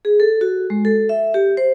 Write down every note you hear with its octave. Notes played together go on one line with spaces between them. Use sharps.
G#4
A4
F#4
G#3
A4
E5
G4
C5